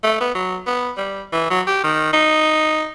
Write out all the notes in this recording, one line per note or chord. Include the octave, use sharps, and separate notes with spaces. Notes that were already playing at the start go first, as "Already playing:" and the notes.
A3
B3
F#3
B3
G3
E3
F#3
G4
D#3
D#4